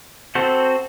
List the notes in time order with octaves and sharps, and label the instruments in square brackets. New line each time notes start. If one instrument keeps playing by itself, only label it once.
[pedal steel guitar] C4 F#4 A4 C5